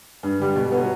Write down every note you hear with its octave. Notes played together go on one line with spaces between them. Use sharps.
G2
D3 G3
B2
F#3 B3